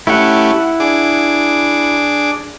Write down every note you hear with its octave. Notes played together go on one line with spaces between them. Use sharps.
A3 C#4 E4 G4 F#5
D4 G#4 D6